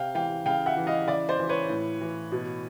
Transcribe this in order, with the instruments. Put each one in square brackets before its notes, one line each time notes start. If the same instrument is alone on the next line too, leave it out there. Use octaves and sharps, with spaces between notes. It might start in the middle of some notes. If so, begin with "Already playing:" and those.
Already playing: [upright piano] C3 F5 G5
E3 F5 G5
C#3 F5 G5
E5 F#5
E3
D#5 F5
C#3 D5 E5
C5 D5
E3
B4 C#5
A2
E3
B2